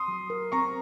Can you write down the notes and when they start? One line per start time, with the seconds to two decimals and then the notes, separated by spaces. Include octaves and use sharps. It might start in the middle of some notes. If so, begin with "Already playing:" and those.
Already playing: C6 D#6
0.08 F#3
0.30 A#4
0.52 C4 A#5 C#6